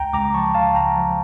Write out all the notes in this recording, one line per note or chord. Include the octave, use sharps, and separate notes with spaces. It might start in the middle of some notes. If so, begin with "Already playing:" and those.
Already playing: C#2 G5 A#5
C#2 A#5 D6
F3 A5 C#6
C#3 F5 A5
C#2 G5 A#5
F3